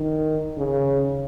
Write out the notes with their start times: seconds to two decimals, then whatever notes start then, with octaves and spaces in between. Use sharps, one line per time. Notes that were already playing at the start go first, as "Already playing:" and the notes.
Already playing: D#3
0.57 C#3